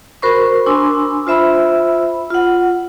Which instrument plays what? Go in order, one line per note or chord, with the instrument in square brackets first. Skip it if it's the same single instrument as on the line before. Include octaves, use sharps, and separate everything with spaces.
[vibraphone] F#4 A#4 C5 B5 C#6
D4 G#5 C6 E6
F4 C5 E5 B5 E6
F4 F#5